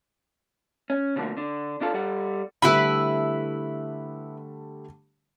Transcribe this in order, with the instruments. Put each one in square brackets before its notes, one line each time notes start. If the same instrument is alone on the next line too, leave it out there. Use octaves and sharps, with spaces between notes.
[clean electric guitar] C#4
B2 D3 F3 A3 A#3 F#4
D3 D4
D3 D4 F4 A4
G3 A4 F#5
[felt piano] D3 G3 A3 [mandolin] E4 B4 B5